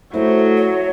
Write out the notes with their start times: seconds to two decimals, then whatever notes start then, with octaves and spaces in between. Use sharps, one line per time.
0.14 F#3 A3 E4 C5
0.57 C#5